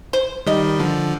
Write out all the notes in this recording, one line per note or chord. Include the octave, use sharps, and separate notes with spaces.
C5
D#3 G3 D#5
D3 F3